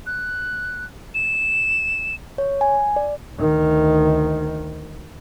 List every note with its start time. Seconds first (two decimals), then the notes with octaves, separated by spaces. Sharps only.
0.06 F#6
1.15 E7
2.38 C#5
2.61 G#5
2.96 D5
3.35 D2 D#3